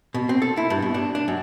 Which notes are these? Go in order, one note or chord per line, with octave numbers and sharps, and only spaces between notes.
B2
C4
A4
E4
G2
B2
D4
D4
F#2